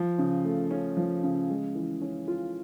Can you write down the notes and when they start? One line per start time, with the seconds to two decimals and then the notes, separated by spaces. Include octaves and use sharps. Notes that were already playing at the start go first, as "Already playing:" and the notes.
Already playing: F3
0.18 C#3
0.45 A3
0.71 C#4
0.97 F3
1.23 C#3
1.49 G#3
1.75 E3
2.01 C#4
2.28 F4